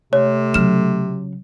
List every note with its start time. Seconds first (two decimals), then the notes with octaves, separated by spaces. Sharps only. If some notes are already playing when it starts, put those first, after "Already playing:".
0.13 C3 A3 C#5
0.54 C#3 F#3 F6 E7